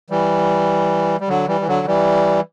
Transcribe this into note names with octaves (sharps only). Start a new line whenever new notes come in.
E3 G3
G3
D3 F#3
E3 G3
E3
D3 F#3
E3 G3